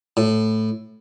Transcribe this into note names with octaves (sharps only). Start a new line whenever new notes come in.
A2